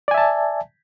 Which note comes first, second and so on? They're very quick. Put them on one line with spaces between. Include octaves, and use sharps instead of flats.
D5 G#5 E5 A5